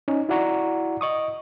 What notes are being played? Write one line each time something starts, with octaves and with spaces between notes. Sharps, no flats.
C#4 D#4
E4 F#4 D5 F#5 A#5 C#6
D#5 C#6 D#6